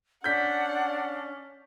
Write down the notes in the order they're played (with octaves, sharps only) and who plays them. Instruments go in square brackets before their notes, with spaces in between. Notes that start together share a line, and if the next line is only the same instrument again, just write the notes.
[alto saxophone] C#4 [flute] D4 [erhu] F#5 [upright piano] G6 B6